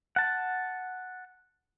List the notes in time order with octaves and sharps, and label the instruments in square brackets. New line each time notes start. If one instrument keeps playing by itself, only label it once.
[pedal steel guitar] F#5 A5